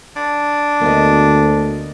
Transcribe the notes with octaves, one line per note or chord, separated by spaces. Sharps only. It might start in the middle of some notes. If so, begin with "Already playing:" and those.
D4
D2 A#3 B3 D#5